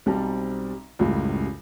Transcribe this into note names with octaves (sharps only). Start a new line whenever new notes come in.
B1 G3 C4 C5 A5 A#5
C#2 F#2 A2 C#3 F#3 G3